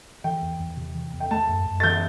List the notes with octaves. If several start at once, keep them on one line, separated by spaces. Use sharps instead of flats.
E3 G5
E2
E2
C3
E3
E2
G5
A3 A5
F#2
F#2
A6
E3 G6